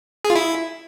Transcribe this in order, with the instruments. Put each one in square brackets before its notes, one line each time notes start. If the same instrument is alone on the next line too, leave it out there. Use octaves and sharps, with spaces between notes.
[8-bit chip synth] G#4
F4
E4